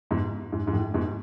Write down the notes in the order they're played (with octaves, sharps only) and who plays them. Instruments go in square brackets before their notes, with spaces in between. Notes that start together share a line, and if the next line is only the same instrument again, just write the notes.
[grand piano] G#2 B2
G#2
G#2
A2
G#2 B2